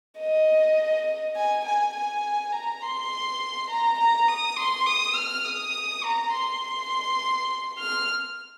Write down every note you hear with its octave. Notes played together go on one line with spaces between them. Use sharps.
D#5
G#5
G#5
G#5
A#5
C6
A#5
A#5
D#6
C6
D#6
F6
D#6
A#5
C6
F6